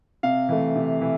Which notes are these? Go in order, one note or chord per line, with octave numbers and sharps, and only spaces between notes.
C3 F5
E3 A3
C3
E3